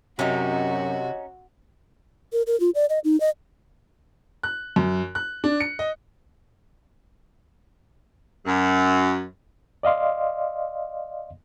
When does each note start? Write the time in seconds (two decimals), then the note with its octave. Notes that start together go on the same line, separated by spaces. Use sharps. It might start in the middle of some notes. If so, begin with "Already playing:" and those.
0.19 F#2 C3 C#4 D#4 F#4
2.33 A#4
2.47 A#4
2.60 F4
2.75 D5
2.89 D#5
3.04 D#4
3.20 D#5
4.43 F#6
4.76 F#2
5.15 F#6
5.44 D4
5.60 C#7
5.79 D#5
8.46 F#2
9.83 D5 D#5 F5 C6